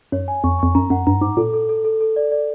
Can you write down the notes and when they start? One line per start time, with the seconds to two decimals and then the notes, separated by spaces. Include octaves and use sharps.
0.12 F#2 C#5
0.28 G#5
0.44 F2 C#6
0.59 F2 C#6
0.75 F#2 A#5
0.90 F#2 F#5
1.07 G2 A#5
1.21 G#2 D6
1.37 A#2 A4
1.53 A4
1.69 A4
1.85 A4
2.00 A4
2.16 D5
2.32 D5